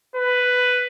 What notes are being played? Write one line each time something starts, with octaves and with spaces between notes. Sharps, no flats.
B4